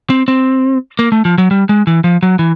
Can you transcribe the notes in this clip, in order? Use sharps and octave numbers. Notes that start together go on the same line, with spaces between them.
C4
C4
A#3
A3
F3
F#3
G3
G#3
E3
F3
F#3
E3